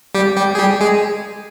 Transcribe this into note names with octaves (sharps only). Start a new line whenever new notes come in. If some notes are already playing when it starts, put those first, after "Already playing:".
G3 G4
G3 G4
G#4
G3 G4
G#3 G#4